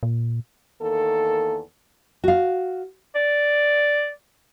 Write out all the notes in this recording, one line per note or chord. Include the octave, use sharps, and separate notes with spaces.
A#2
E2 D#3 A#3 A4
F#4 F5
D5